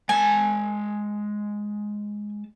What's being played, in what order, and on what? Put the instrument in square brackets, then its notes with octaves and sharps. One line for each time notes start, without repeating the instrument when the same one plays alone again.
[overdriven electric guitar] G#3 A5 [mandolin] G#5